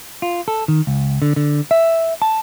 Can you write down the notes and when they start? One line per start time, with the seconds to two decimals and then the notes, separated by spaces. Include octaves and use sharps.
0.22 F4
0.48 A4
0.68 D#3
0.87 C#2
1.22 D3
1.36 D3
1.71 E5
2.22 A5